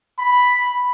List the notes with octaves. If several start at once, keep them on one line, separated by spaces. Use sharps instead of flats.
B5